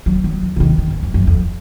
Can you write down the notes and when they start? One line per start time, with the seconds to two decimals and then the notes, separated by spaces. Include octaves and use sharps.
0.06 F#3
0.24 F#3
0.42 F3
0.56 C#3
0.60 D#3
0.78 D#3
0.90 G#2
1.03 F#2
1.14 F#2
1.27 F2